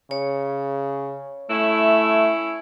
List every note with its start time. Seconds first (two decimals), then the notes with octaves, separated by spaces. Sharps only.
0.11 C#3 C#5
1.50 A3 C#4 E4